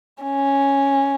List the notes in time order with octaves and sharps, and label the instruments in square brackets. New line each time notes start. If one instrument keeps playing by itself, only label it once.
[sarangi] C#4